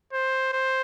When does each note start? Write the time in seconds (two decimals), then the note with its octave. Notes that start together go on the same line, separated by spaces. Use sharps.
0.13 C5
0.53 C5